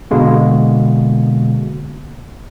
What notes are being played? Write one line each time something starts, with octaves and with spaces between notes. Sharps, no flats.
B2 D3 G#3 A#3